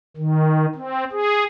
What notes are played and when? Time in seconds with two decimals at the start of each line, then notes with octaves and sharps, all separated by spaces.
0.17 D#3
0.75 C4
1.12 G#4